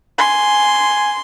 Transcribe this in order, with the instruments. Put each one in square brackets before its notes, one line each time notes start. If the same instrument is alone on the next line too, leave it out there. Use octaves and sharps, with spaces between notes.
[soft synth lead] G#5 [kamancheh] C6